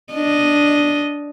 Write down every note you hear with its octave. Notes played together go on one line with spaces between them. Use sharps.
D4 D#5